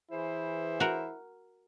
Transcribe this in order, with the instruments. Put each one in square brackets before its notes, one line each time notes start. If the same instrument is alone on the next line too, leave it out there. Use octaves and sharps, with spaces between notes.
[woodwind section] E3 G#4 C5 [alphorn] E4
[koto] F#4 A#4